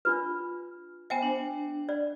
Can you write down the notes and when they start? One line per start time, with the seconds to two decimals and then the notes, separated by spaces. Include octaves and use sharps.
0.05 D4 F4 B4
1.10 B3 C5 E5 G5 G#5
1.23 D4
1.89 D5